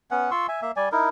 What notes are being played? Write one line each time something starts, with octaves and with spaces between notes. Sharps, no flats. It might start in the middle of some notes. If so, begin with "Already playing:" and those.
B3 C#4 F#5
F4 C6 C#6 E6
E5 G#5
A#3 E5
G3 D5 G#5
D#4 E4 A#4